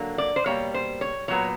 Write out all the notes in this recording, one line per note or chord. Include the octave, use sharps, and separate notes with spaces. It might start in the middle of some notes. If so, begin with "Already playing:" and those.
Already playing: D3 F#3 A#3
D5
C5
B2 G3 A#3 C#5
C5
C#5
A#2 F#3 B3 C#5